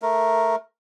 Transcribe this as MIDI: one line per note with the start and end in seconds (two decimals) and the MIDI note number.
0.02 0.56 57
0.02 0.56 70